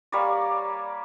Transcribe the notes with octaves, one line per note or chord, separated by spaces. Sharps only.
G3 A#3 C#5 D5